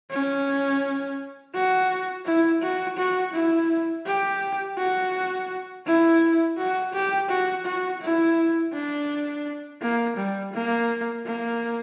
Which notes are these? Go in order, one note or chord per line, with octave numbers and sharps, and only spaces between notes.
C#4
F#4
E4
F#4
F#4
E4
G4
F#4
E4
F#4
G4
F#4
F#4
E4
D4
A#3
G3
A#3
A#3